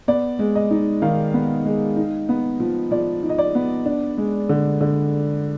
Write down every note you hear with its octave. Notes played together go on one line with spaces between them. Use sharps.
B3 D5
G#3
D#5
D#4
D#3 F5
B3
G#3
D#4
B3
F3
F3 D5
D#4
D#5
D5
B3
D4
G#3
D3
D3